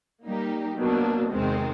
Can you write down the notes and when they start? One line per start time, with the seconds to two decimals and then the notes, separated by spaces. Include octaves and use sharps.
0.23 G3 A#3 D#4 G4
0.77 B2 F#3 A#3 D4
1.31 E2 C3 D#3 G#3 C4